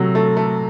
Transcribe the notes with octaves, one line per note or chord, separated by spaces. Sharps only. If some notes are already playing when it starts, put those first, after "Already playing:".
Already playing: C3 F#3 A3
A3
A3